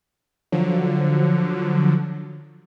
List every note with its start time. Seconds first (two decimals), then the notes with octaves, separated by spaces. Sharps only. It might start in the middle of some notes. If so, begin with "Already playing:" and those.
0.52 D3 F3 F#3